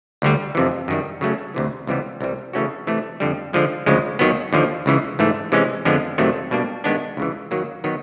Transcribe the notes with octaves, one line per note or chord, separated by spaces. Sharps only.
D2 D3 G3
F2 C3 E3
F#2 D#3 G3
C#3 F#3 A3 C#4
D2 C3 E3
C#2 C3 E3 G3 B3
C2 C3 E3 G3
C#3 E3 A3 C#4 F#4
C3 E3 A3
F2 D3 G3
D3 F3 G#3
D2 C#3 F3 G#3
D#2 D#3 F#3 B3
D#2 D3 F3
C#2 C#3 E3
G#2 E3 A3
C3 E3 G#3 C#4
F2 D3 F3 G#3 B3
F2 C3 D#3 F#3 A3
B2 G3 A#3 D4
G2 D#3 G#3 B3 D4
C#2 C#3 E3
F#2 D#3 F#3 A#3
D#3 F#3 B3 D#4